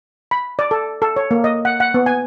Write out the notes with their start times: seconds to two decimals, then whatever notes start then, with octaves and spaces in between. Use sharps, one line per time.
0.31 B5
0.59 D5
0.71 A4
1.02 A4
1.16 C#5
1.31 A#3
1.44 D#5
1.65 F#5
1.80 F#5
1.94 B3
2.06 G#5